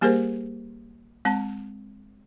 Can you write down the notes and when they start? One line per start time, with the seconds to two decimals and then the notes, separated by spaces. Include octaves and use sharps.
0.01 G3 A#3 G4 G#4 A#4 C5
1.25 G#3 C4 A5